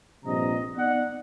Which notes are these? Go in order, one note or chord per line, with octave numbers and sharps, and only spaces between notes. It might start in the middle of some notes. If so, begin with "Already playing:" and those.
A#1 G2 C3 D#5 A#5
B3 D#4 D5 F#5